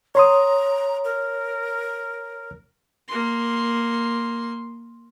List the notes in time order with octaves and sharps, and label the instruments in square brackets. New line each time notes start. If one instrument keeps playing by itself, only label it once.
[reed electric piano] C#5 C6 D#6 [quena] A#5
[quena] A#4
[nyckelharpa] A#3 C6